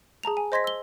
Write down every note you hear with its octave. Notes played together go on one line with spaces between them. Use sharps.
G#4 A5 A#5 F7
G#5
C5 D#5 C6 G#6 A#6 B6
E6 G7